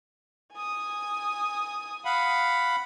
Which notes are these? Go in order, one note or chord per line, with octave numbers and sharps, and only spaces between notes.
G#5 D#6
F5 F#5 B5